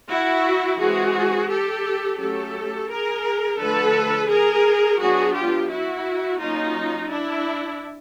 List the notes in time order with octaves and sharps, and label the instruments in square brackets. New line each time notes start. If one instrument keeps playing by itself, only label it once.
[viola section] E4 F#4
E3 G#3 C4 F#4 G#4
G4 A4
F#3 A3 C#4 G4 A4
G#4 A#4
D3 F3 A3 A4 B4
G#4 A#4
F#3 B3 D4 F#4 G#4
F4 G4
E4 F#4
F#3 A#3 C#4 D#4 F4
D4 E4